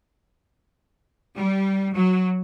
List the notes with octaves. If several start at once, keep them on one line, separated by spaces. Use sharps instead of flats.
G3
F#3